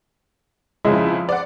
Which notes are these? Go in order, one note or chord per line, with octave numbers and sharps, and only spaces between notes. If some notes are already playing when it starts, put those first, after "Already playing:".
F2 C#3 G#3 E4
D5 F#5